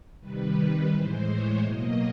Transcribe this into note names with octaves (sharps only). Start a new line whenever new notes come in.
C3 D#3 G3 B4
A2 E3 G#3 C5
C#5
B2 F#3 A#3 D#5